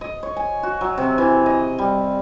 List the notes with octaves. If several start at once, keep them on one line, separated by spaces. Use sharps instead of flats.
D#5
C#5
G#5
F#4
F#3
C3
E3
D#5
G3